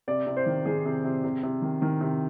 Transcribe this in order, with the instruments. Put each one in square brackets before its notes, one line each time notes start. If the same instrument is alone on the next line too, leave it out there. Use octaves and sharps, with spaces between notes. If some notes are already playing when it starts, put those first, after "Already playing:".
[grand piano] C3 D5
C3
C5
D#3
D#3 G#4
C3
C3
C3
C3
D#3
D#3
C3